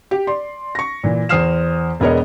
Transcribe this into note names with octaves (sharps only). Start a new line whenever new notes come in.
G4
D5 C6
C#6 A#6
A#2 E3
E2 C5 D#6 F6 C7 E7
E1 B3 G#4 A#4 C#5 D#5